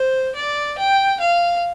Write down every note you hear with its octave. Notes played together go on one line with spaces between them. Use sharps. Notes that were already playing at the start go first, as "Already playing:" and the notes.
Already playing: C5
D5
G5
F5